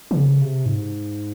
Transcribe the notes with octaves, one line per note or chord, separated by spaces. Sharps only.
D#3
C#3
C3
G#2